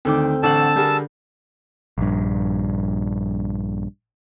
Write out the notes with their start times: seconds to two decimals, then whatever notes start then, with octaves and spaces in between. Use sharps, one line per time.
0.05 D2 D#3 C4 A4 C5 D6
0.43 A1 D3 F#5 A5 E6
0.76 G3 G#4 A#4
1.98 A#1 G2